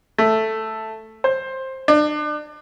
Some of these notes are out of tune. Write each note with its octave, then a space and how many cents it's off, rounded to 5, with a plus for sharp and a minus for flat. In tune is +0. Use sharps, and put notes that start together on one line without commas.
A3 +0
C5 +15
D4 +35